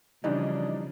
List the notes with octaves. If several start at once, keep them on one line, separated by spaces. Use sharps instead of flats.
C#3 E3 F3 G3 D4 D#4